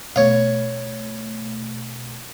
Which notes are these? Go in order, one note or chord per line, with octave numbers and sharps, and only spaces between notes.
B2 A3 C#5 F5